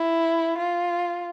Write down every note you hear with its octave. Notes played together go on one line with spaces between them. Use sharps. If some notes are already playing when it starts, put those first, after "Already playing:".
Already playing: E4
F4